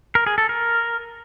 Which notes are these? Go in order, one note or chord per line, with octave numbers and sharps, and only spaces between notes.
A#4
G#4
A4
A#4